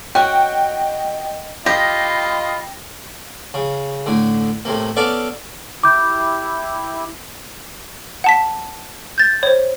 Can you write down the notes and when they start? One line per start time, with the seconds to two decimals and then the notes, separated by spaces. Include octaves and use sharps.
0.15 C#4 F#4 D#5 G5
1.66 F4 G4 D#5 B5 A#6
3.54 C#3
4.06 A2 D3
4.65 A2 C3 A#3
4.96 B3 C#4 A4 D5 F5 D6
5.83 E4 G4 D6 G6
8.24 F#5 A5 B6
9.18 G6 A6
9.43 C5 C#5